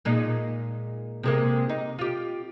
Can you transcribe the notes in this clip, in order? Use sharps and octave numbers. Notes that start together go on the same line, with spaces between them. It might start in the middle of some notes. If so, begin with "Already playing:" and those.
A#2 G#3 D#4
C3 G#3 A#3
D#4
F4 G4